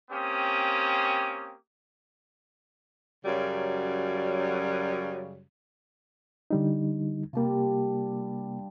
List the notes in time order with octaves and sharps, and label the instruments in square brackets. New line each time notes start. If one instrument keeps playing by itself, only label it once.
[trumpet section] A#3 C4 C#4 G4 D#6
[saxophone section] F#2 C#3 F#3 G3
[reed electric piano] D3 G3 D#4
[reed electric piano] C3 A#3 [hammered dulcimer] G3 D4 F4